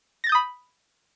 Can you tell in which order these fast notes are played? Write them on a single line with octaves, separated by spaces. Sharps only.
A#6 A6 G6 D#6 B5